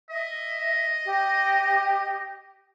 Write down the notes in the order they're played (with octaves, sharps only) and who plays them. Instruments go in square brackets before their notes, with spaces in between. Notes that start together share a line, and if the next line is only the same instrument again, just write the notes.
[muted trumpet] D#5 [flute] E5
[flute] G4